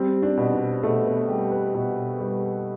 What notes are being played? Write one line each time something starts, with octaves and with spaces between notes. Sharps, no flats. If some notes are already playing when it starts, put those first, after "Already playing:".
Already playing: G3 C4
D4
B2
D4
B2 A3
B3
G3 G4
B4
B2
G3